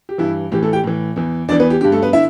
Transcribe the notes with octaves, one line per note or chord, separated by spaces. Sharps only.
G4
G2 E3 E4
A2 E3 G4
A3 A4
G4 G5
A2 E3
E2 E3
E2 E3 D4 D5
B3 B4
G4
G2 D3 G4
A3 A4
B3 B4
D3 E4 E5